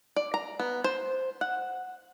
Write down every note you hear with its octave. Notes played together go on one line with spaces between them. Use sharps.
D5
A#5
B3
C5
F#5